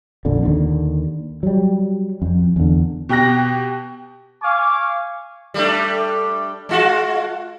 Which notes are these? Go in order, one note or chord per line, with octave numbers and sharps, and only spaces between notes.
A#1 F2 D3
D#2 D3
F#3 G3
F2
E2 D3
B2 G4 G5 F#6 A#6
F5 G#5 C#6 D6
G3 A3 D4
G#3 F4 F#4